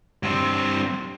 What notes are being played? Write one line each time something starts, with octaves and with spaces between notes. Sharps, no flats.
G2 C4